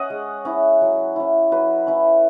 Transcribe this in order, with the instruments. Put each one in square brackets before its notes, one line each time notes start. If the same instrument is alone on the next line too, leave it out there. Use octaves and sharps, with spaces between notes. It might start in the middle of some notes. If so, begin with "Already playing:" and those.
Already playing: [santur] C#4 D#5 F#5
G#3
C#4 E4
F#3
C#4 E4
F#3 B4
C#4 E4